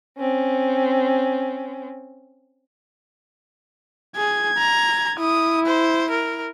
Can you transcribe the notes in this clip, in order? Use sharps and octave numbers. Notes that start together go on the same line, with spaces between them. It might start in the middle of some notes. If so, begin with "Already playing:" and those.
C4 C#4
G#4 G#6
A#5
E4 D#6
C5
A#4